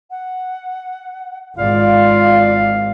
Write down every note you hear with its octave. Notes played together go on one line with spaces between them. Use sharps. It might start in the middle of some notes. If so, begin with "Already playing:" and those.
F#5
G#1 F4 D5 F5